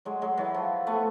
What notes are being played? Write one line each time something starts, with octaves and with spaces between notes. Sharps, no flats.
F#3 G#3
F#3 G#3
E3 F#3
F3
A3 B3